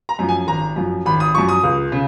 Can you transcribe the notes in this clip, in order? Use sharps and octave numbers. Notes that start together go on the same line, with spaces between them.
A#5
F#2 F3
G#5
G#1 A#5
F#2 F3
G#1 B5
D#6
F#2 F3 C#6
D#6
C#2
C#3